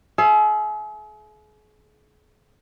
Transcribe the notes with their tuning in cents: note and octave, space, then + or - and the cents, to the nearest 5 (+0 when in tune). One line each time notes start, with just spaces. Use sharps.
G#4 +40 E5 +40